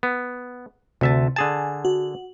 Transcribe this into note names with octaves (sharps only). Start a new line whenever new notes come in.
B3
D2 C3 E5 A5
D3 G#4 G#5 A5
F#4